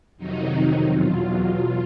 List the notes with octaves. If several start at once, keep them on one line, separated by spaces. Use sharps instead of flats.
F2 C3 D#3 F#3 D#4
E2 B2 F#3 F4